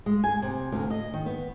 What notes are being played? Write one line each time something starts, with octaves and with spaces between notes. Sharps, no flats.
G#3
G#5
C3
D2
D#5
D#3
B3